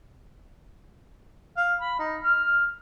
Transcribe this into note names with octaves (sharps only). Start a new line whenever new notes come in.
F5
B5
D#4
F6